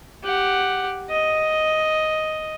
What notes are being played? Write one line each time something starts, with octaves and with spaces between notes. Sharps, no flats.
G4 F#5
D#5